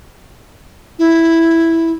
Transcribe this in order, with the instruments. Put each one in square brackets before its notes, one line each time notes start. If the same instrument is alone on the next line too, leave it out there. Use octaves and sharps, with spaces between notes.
[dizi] E4